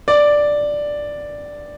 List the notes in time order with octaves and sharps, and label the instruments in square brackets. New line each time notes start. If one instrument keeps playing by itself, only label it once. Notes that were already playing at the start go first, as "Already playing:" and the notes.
[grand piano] D5